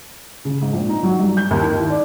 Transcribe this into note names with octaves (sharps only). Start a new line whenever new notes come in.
C#3
G#2
A#1
D#4
F#3
G2
G6
D#2
D#3
E4
D5